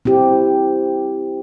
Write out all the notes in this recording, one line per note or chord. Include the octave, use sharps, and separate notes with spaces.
C4 E4 G4